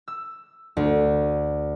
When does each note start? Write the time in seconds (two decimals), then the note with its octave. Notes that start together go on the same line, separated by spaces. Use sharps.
0.08 E6
0.77 D2